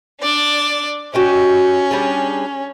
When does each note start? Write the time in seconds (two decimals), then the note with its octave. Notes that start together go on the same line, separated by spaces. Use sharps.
0.20 D4 D5
1.14 C#4 F#4 G4 D#5
1.91 G3 D4 G#4